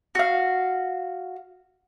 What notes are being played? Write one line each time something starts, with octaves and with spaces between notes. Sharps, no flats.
F#4 F5